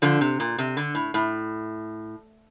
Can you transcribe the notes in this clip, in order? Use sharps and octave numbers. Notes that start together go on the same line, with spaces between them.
D3 F3
C3
A#2
C3
D3
A2
A2